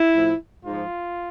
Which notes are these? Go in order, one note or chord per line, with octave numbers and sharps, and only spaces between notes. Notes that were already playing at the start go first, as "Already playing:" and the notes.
Already playing: E4
A2 F3
G#2 F3 F4